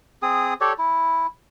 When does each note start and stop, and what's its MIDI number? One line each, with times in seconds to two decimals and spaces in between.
0.22 0.54 60
0.22 0.54 68
0.22 0.54 87
0.61 0.73 67
0.61 0.73 69
0.61 0.73 73
0.61 0.73 74
0.78 1.26 64